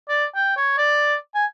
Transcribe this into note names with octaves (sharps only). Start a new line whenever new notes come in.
D5
G5
C#5
D5
G#5